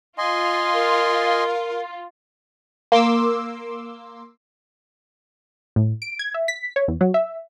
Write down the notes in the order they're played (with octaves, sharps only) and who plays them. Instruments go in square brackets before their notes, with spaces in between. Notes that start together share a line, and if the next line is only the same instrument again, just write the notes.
[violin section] F4 [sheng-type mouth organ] D#5 G#5 C6
[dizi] A#4
[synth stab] A#3 C6 D6 E6
A2
D7
G#6
E5
B6
C#5
E2
F#3
E5